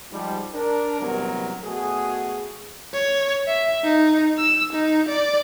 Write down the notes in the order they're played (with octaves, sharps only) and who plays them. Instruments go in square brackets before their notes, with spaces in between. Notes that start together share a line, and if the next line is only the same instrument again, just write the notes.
[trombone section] G#2 F3 G3
D4 A#4
A1 G2 C3 F#3 B3 A#4
B2 A3 F#4 G#4
[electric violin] C#5
E5
D#4
E6
D#4
D5